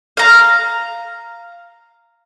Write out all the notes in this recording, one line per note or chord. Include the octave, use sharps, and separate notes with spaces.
F5 A#5